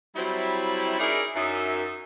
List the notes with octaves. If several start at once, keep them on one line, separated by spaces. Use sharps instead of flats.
F#3 G3 C4 E4
C#4 D#4 E4 G#4 A#4 D5
F#2 D#4 E5